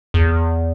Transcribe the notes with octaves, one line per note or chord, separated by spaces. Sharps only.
E2